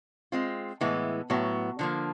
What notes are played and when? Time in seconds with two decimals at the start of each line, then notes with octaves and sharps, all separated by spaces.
0.32 G#3 C4 F4
0.81 A2 E3 G#3 B3
1.30 A2 F#3 B3
1.79 D3 F3 A#3